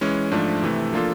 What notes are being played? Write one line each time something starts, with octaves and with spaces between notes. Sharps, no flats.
E3 G#3 C#4
G#2 F3 A3 D4
C3 E3 A3
F3 A#3 D4 F4 A4